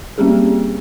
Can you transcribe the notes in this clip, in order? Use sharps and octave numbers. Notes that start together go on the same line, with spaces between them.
G3 A#3 C4 C#4 G4 G#4